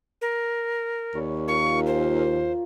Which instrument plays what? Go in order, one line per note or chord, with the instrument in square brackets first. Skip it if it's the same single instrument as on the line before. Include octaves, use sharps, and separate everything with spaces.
[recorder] A#4
[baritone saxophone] D#2 [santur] C#5 D5 B5
[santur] F3 A#4 F5 [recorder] C#6
[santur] F4 A#4 G#5 [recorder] C5